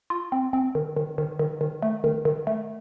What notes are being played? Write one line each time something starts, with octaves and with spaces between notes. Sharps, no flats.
F4
C4
C4
D#3
D#3
D#3
D#3
D#3
A3
D#3
D#3
A3